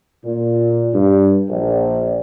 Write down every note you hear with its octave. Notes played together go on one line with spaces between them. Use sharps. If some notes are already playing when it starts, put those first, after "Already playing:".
A#2
G2
A#1